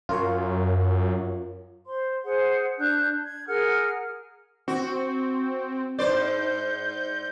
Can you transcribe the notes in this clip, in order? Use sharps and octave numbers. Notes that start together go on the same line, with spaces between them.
F#2 F4 A#4 C#5
C5 C6
G#4 C5 F#5
D4 F#6 G6
G#6
G#4 A#4 F#5 F6
C4 F#4
G#2 C5 D5 G6